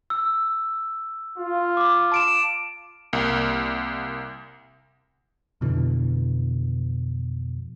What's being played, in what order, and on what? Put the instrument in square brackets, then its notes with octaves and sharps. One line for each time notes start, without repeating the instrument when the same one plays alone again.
[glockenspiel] E6
[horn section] F4
[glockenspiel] D6
A5 D7 E7
[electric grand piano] C2 A#3
[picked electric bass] F2 B2 D3 E3